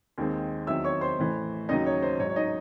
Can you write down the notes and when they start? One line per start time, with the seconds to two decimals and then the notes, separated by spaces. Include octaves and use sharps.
0.18 D#2 D#3 G#3 C4
0.67 E2 D#3 F#3 C4 E5 E6
0.84 C#5 C#6
1.01 C5 C6
1.18 A1 A2 E3
1.69 D#2 C#3 F#3 D#4 D#5
1.86 C#5
2.02 C5
2.19 A1 G#2 F#3 C#5
2.29 C#5
2.36 D#4 D#5